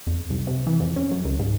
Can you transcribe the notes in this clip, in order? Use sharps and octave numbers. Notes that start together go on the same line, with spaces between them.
F2
C2
C3
E3
F2
C#4
F#2
C#2
G#2